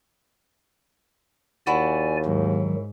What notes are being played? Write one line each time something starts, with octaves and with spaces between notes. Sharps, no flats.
D#2 E4 F#4 D5 G#5
G#2 D#3 F#3